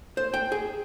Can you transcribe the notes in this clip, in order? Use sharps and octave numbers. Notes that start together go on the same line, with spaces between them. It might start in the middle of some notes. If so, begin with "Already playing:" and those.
C5
G5
G#4